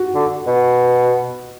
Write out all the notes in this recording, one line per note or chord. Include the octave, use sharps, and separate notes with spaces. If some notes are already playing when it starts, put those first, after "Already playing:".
Already playing: F#4
D3
B2